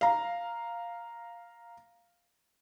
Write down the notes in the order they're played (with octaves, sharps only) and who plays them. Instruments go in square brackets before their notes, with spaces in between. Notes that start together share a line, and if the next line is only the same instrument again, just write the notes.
[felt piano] F5 A#5